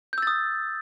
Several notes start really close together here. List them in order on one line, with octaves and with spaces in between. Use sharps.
G6 E6 A6 D#6